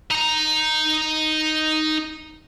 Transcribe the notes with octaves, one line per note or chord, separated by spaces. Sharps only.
D#4 A#5